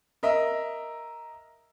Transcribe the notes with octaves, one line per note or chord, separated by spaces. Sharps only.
A#4 D#5 E5